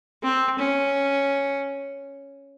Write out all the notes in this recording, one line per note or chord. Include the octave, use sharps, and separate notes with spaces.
C4
C#4